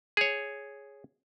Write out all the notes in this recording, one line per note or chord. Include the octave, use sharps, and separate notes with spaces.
G#4 C#5